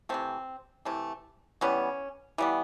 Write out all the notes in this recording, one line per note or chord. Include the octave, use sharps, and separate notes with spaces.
C3 E3 A3 C4
C3 E3 A3
E3 G3 B3 C#4
E3 G3 B3